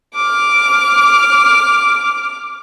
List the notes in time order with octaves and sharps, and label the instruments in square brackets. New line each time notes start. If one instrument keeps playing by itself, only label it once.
[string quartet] D6 F6